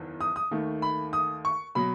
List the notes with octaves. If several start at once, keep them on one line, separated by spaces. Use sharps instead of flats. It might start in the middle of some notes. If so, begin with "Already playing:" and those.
Already playing: F#1 E2 D#3
D#6
D#6
D#2 D#3 A3
B5
D#6
C#6
B2 F#3 B5